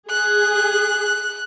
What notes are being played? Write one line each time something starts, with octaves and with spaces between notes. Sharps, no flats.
G#4 F#6